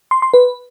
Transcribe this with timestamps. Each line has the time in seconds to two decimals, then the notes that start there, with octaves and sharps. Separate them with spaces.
0.11 C6
0.22 C6
0.34 B4